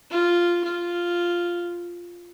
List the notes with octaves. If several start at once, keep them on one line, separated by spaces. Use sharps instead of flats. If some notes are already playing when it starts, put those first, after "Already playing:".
F4
F4